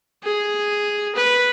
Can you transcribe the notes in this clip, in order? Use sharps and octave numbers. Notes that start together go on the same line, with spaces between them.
G#4
B4